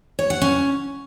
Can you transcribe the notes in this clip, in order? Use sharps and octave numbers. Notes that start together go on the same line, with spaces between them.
C#5
F#5
C#4